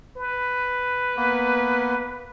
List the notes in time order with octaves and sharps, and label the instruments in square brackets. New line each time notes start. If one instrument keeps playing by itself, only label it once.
[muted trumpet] B4
[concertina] A#3 B3